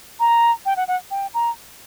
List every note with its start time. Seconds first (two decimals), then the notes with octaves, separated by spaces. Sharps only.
0.20 A#5
0.66 G5
0.77 F#5
0.88 F#5
1.11 G5
1.34 A#5